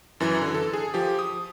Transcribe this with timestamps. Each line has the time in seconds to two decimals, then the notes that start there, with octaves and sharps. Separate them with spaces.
0.20 F#2 E3
0.42 D3
0.55 A4
0.73 G#4
0.94 F3 G4
1.19 D#6